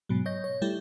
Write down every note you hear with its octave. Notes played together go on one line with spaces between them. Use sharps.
G#2 B2 F#3
C#5 D#5 G6 A#6
C#5
G3 A3 E4 G4